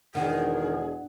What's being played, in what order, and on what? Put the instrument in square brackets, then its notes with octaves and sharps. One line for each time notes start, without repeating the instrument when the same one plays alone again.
[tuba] E1 [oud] D#3 [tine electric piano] D4 F#5 [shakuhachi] G#4